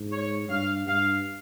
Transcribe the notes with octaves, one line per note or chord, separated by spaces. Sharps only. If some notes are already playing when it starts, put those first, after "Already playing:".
Already playing: G#2
C#5
G2 F5
G2 F5